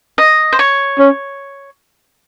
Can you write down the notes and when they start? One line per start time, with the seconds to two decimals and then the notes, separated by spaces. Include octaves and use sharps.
0.18 D#5
0.53 C5
0.59 C#5
0.99 C#4